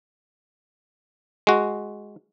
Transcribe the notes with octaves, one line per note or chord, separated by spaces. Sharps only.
G#3 F#4